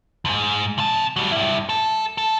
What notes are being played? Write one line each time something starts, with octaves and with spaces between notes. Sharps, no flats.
F2 G#2
C3 A5
F#3 G3
G2 E4
A4
A4